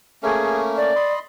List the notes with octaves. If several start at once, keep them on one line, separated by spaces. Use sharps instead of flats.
A3 A#3 C#4 G#4
D5
D#5 B5 C6